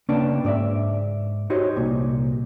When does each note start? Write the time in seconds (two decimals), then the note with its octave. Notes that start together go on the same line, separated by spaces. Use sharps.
0.09 C#3 A#3 C#4 D4 B4 G5
0.44 G#2 D5 E5
1.50 D#4 F#4 G4 C5 C#5 D#5
1.76 C2 A#2